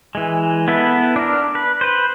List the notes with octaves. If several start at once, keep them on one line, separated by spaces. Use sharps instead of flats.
E3 G#3
B3 E4 A4 B4
D4 A#4
B4
B4 C5